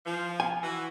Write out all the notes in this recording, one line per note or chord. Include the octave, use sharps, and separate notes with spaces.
F3
G#5
E3 F#4